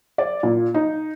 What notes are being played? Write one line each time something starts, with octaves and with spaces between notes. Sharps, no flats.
D5
A#2
D#4